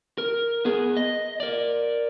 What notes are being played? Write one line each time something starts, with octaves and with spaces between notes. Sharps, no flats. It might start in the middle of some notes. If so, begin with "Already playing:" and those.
A#4
B3 G#4
D#5
A#4 D5